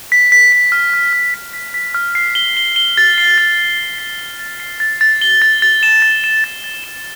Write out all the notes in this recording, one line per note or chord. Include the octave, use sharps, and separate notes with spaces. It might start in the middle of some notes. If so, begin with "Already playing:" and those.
B6
B6
B6
F6
F6
F6
B6
B6
B6
F6
C7
G7
G7
G7
A6
C7
A6
A6
A6
C7
G7
A6
C7
A6
A6
G7
A6
A6
E7
A6
E7
A6
A6
E7